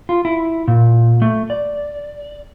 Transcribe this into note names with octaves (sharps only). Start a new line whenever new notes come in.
F4
E4
A#2
A3
D5